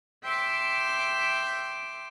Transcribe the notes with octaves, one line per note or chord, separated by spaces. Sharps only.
E5 G5 C6 D6